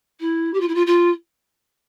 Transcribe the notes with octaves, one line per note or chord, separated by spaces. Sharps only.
E4
G4
F4
E4
F4
F4